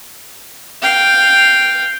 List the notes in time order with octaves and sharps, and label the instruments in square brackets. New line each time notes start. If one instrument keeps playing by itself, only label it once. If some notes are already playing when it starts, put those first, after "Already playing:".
[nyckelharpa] F5 G5